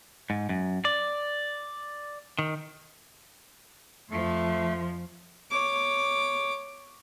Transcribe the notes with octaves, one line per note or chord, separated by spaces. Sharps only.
G#2
F#2
D5
D#3
F2 F3 A3
C#5 D6